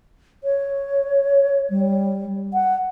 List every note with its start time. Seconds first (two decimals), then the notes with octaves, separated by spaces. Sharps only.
0.44 C#5
1.70 G3
2.54 F#5